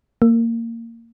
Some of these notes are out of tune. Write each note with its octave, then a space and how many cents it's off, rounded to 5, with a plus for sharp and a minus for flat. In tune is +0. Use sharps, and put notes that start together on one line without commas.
A#3 -20